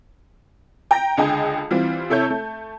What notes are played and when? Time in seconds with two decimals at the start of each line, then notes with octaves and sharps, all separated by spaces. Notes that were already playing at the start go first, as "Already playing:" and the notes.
0.91 G5 A#5 A#6
1.17 C#2 D3 G#4 D#5 G5
1.71 E3 G3 C4 F4
2.10 C3 E4 A4 C#5 G6
2.30 A3